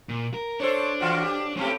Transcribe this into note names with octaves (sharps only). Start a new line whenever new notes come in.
A#2
A#4
D4 A4 C5 C#5
E3 F4 F#4
G4
A2 A3 C4 C#4 G4